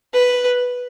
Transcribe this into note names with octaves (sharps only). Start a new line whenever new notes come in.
B4